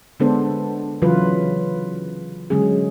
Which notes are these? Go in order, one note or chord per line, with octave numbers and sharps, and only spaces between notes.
D3 G#3 B3 D4 A4 C5
C#3 E3 F#3 F4 B4
D3 F#3 G#3 C#4 G#4